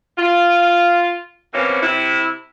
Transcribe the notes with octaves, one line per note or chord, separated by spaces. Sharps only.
F4
B2 E3 A#3 C4 C#4
C3 E4